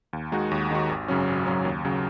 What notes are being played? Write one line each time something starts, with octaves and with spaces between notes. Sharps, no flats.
D#2
D#3 G#3 D#4 F#4
D#2
D#3 G#3 D#4 F#4
G#1
F#2 C#3 F#3 C#4
G#1
F#2 C#3 F#3 C#4
D#2
C#3 F#3